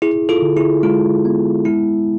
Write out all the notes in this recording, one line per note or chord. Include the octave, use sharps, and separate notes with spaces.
E4 G#4
F4 A4
D3
E4 G#4
G#3 F4
B3
G#3 E4